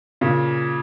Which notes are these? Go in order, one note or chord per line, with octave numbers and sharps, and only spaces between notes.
A#2 C#3